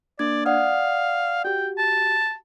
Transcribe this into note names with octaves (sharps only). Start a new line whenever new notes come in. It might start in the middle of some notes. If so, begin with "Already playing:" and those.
A#3 D4 D5 G#6
D5 F5 F#5 D#6
F#4 G4 G5
A5